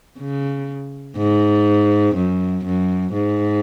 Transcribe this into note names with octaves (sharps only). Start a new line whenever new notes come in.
C#3
G#2
F#2
F#2
G#2